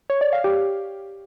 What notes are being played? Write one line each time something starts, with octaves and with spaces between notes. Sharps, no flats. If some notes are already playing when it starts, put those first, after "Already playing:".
C#5
D5
F5
G4